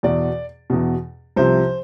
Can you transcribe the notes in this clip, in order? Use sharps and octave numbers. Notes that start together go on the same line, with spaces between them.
E2 B2 D5
E2 B2
C2 C3 F3 C5